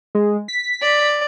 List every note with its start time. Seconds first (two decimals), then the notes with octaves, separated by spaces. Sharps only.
0.15 G#3
0.48 B6
0.82 D5